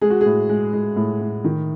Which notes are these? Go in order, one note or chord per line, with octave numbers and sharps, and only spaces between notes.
G#3 G#4
F#4
G#4
A2
G#3
G#3
A2
A2
D#3